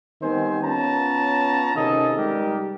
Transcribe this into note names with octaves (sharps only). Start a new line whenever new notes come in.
D#3 G3 B3 C4 C5 G#5
B3 C#4 F4 C#5 A5 A#5
C3 D#3 C#4 G#4 A4 D#5
G3 G#3 D#4 G4 A#4